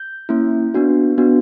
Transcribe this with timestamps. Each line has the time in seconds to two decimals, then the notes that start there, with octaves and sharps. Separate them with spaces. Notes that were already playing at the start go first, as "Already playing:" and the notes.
Already playing: G6
0.29 A#3 C#4 E4
0.74 B3 D4 F#4
1.18 B3 D4 F#4